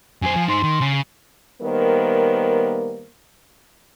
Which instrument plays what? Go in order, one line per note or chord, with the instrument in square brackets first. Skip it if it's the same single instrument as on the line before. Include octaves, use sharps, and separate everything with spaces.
[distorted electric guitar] F#2 C5 [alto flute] G#5
[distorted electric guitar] F3
[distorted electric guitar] D#4 C5 [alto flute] C6
[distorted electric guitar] D#3
C#3
[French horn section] D#3 G3 A#3 B3 A#4 C5